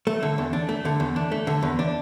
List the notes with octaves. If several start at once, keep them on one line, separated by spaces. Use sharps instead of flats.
A3
D3
E2
D4
A3
D3
E2
D4
A3
D3
E2
D4